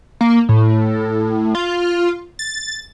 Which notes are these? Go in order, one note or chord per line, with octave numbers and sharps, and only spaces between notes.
A#3
A2
F4
A6